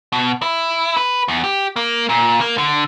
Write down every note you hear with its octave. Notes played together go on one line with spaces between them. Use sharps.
B2
E4
B4
E2
G4
A#3
A#2
A#3
D3